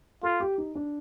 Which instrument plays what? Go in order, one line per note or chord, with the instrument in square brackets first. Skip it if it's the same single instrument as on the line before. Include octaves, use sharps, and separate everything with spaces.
[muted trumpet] F4 [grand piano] A4
[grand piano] G4
D#4
D4